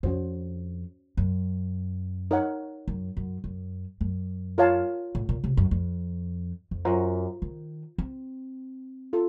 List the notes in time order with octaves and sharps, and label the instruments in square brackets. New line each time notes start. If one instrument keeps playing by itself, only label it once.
[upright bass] F2 [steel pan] C#4 F#4 C5
[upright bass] F#2
[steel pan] D#4 A#4 C#5 F#5
[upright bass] F#2
F#2
F#2
F#2
[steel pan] F4 A#4 C#5 F5 A5
[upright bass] A2
A#2
C3
F#2
F2
F2
[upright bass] F#2 [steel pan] F4 C5 F#5 A#5 C#6
[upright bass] D#3
C4
[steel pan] F4 A4